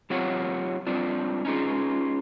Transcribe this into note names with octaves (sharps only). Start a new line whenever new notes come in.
F#3 C4 F4 G4 C#5 F#5
G3 C4 D4 F4
C#4 D#4 F4 G#4